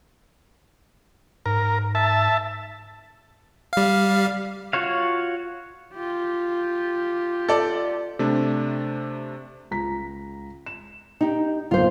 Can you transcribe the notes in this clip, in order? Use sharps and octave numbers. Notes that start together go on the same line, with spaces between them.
G#2 A#4
E5 A5
G3 F5
F4 F#4 C#5 F5
F4 G4
A4 D5
C3 A3 D4
C#2 A#5 B6
E7
D#4 G4
F#1 B1 D3 F4 C5